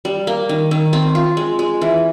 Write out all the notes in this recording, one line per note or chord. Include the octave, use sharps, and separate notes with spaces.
G3
A#3
D#3
D#3
C4
F4
G#3
G#3
E3